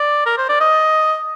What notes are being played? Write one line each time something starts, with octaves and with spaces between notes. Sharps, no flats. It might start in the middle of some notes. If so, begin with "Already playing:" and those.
Already playing: D5
A#4
C5
D5
D#5